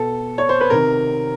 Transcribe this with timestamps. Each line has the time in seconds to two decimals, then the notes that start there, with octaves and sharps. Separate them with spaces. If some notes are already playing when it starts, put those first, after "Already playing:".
Already playing: B2 A4
0.38 C#5
0.49 C5
0.61 B4
0.70 C3 D#3 A#4